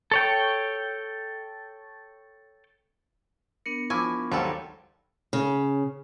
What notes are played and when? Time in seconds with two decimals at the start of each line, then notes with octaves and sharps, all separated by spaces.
0.11 A4 C#5 G5
3.66 B3 D4 A#4 C#7
3.90 F3 E4 G#5 C#6 D6
4.32 G#1 D#2 F#3 G3 A4 C5
5.33 C#3